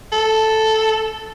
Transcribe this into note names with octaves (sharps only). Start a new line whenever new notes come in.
A4